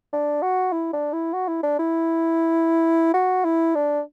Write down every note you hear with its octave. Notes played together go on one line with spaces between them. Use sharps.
D4
F#4
E4
D4
E4
F#4
E4
D4
E4
F#4
E4
D4